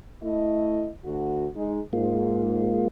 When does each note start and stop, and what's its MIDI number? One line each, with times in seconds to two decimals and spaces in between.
0.23 0.89 57
0.23 0.89 64
0.23 0.89 75
1.05 1.47 38
1.05 1.47 50
1.05 1.47 66
1.56 1.80 56
1.56 1.80 63
1.93 2.84 44
1.93 2.88 56
1.93 2.88 58
1.93 2.88 65